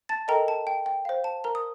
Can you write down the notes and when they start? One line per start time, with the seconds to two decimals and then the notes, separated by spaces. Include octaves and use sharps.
0.09 A5 A6
0.28 A4 A#4 D#5 G5 A#5
0.48 A5
0.67 G5
0.86 G5
1.05 C5 F5
1.24 A5
1.44 A#4 A#5
1.55 D#6